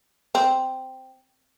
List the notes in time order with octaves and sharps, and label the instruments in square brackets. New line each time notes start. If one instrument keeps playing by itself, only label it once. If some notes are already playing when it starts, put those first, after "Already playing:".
[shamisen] C4